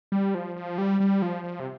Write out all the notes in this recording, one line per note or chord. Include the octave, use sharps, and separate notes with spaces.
G3
F3
F3
G3
G3
F3
F3
C3